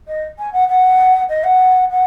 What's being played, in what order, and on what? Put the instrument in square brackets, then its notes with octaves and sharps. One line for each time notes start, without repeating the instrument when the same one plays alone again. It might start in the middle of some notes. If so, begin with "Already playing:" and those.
[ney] D#5
G#5
F#5
F#5
D#5
F#5
F#5